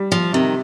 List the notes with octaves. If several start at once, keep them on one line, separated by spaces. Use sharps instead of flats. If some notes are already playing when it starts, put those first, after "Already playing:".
Already playing: G3
F3
C3 D#3